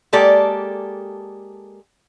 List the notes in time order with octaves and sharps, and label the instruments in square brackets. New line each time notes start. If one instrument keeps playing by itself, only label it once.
[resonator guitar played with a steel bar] G#3 A#3 G4 A4 D5